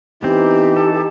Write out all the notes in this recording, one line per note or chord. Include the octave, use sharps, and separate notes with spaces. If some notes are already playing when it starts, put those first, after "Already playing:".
E3 B3 C4 D#4 G4
A4